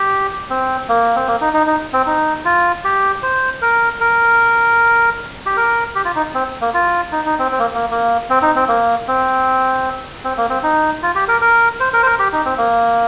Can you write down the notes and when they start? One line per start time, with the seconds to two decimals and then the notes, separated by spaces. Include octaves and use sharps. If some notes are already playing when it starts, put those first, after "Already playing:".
Already playing: G4
0.50 C4
0.89 A#3
1.16 C4
1.27 A#3
1.41 D#4
1.54 D#4
1.67 D#4
1.93 C4
2.06 D#4
2.45 F4
2.84 G4
3.22 C5
3.62 A#4
4.00 A#4
5.46 G4
5.57 A#4
5.95 G4
6.05 F4
6.15 D#4
6.35 C4
6.61 A#3
6.74 F4
7.12 D#4
7.26 D#4
7.39 C4
7.52 C4
7.59 A#3
7.74 A#3
7.90 A#3
8.30 C4
8.42 D#4
8.55 C4
8.68 A#3
9.08 C4
10.24 C4
10.37 A#3
10.50 C4
10.63 D#4
11.02 F4
11.15 G4
11.28 A#4
11.41 A#4
11.80 C5
11.93 A#4
12.03 C5
12.06 A#4
12.19 G4
12.32 D#4
12.45 C4
12.57 A#3